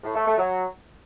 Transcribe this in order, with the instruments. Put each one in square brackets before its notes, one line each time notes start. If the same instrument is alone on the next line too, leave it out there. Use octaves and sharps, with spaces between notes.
[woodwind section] A2
A3
A3
F#3